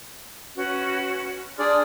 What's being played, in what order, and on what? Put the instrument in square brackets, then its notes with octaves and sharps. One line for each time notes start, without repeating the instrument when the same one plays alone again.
[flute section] C#4 F#4 B4
[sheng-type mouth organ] D4 G#4 D5 [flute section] C6 D#6 F6